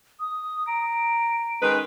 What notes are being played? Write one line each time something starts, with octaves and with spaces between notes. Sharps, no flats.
D#6
A#5 D7
D#3 G#3 C#4 B4